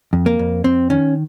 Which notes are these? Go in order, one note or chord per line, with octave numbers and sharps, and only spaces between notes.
F2
A#3
F2
F2 C4
D#3 C#4